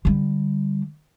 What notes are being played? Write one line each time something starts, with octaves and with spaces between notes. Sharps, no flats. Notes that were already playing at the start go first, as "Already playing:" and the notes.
D3 G3